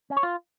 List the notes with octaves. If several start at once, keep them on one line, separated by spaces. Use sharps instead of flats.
C#4
C#5
F4